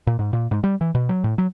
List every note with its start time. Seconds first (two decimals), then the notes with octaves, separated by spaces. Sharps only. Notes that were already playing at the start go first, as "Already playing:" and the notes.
0.07 A#2
0.19 G#2
0.33 A#2
0.51 G#2
0.64 G3
0.81 E3
0.95 B2
1.09 F#3
1.24 A2
1.38 F#3